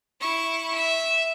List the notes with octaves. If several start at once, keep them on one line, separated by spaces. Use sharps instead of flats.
E4 C#6
E5